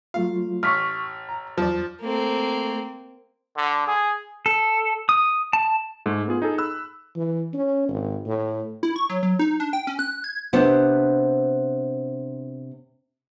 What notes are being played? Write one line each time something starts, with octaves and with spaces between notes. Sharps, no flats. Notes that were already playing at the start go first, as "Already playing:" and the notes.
F#3 A3 F4 F5
A1 C#6 D6 F6 B6
A#5
E2 F3 F#3 D5
A3 A#3 C4
D3
G#4
A4
D#6
A5
G#2 G#3 A3
B3 F4 G#4
D#4 G#4 A4
B5 E6 F#6
E3
C#4
G#1
A2
E4
C#6
F#3
F#3
D#4
D4
G5
C#4
F#6
G#6
C3 B3 D4 C5